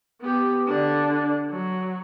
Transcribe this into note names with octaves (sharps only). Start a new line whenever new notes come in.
B3 G4
D3 D4
F#3